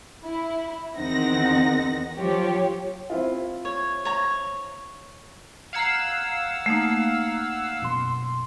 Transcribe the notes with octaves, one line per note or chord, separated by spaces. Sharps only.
E4
E2 D#3 C4 D#4 F#5 A#6
F3 F#3 G4 C#5
C4 E4 F4
C#5
C#5 A#5
F5 F#5 A#5 E6 G#6 C7
A3 A#3 D#4
F#2 B2 C6